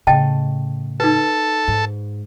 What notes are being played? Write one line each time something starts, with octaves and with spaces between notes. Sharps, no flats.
A2 C#3 D#5 G5 A5
D#4 A4 B4
G#2